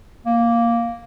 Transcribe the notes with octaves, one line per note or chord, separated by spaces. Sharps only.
A#3